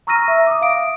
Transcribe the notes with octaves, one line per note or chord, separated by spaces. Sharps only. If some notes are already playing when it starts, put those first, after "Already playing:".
A#5 C#6 E6 F6 A#6 D#7
E5
D6 D#6
F5 D7